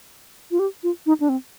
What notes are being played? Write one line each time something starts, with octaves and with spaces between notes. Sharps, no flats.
F4
G4
F4
D#4
D4
C4